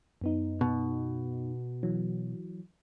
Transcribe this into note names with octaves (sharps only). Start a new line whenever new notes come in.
F#2 B3 D#4
B2
E3 F#3